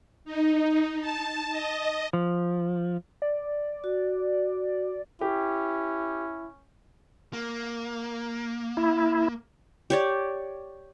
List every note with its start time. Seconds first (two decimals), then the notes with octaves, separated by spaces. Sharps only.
0.25 D#4
1.01 A5
1.50 D#5
2.13 F3
3.22 D5
3.84 F#4
5.21 C#4 E4 G4
7.33 A#3
8.77 E4
9.90 G4 C#5 D5